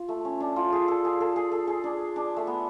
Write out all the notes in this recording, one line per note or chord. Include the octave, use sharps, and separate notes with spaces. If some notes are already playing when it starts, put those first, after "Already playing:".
Already playing: F4
A3
C#4
D4
F4
G#4
A4
G#4
A4
G#4
A4
G#4
D4
D4
A3
B3